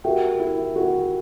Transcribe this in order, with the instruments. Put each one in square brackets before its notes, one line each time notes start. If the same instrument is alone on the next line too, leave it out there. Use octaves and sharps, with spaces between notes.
[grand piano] F#4 [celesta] G4 A#4 E5 G5
[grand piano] E4
F#4